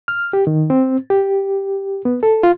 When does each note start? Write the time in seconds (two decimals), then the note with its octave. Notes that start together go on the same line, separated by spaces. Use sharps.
0.08 F6
0.33 G4
0.47 D#3
0.70 C4
1.10 G4
2.05 B3
2.23 A4
2.43 F4